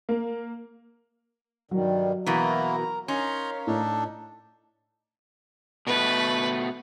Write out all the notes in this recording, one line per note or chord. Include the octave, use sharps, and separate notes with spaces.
A#3
G2 D#3 F#3 G3
B2 E3 A#3 E4 F#4 A#4 A#5
C#4 D#4 A#4 C#5 F5 A#5 C6
A2 D4 D#4 A4
B2 A3 B4